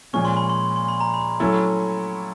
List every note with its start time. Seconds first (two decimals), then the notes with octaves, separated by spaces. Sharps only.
0.13 A#2 F3 G#3 C#4 C#6
0.25 C6
0.37 B5
0.50 C6
0.76 C6
0.88 B5
1.00 A#5
1.14 B5
1.40 F#3 A3 C#4 E4 A4